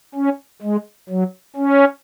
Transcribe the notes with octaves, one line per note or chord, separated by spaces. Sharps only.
C#4
G#3
F#3
C#4